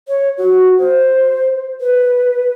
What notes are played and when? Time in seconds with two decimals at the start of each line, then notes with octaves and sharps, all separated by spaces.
0.08 C#5
0.38 F#4
0.79 C5
1.81 B4